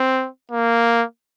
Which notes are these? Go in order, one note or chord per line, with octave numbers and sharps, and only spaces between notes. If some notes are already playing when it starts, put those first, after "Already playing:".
Already playing: C4
A#3